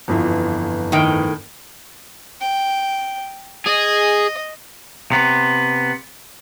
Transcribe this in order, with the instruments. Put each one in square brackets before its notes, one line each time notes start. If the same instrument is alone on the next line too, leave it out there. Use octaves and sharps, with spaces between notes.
[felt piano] G1 F2 E3
[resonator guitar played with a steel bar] A2 D#3 G5
[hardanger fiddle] G5
[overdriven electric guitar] G#4 [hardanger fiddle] D#5
[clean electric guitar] C3 B3